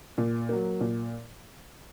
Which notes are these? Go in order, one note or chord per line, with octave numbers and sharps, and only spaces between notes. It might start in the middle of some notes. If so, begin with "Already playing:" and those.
A#2
F#3 A#3
A#2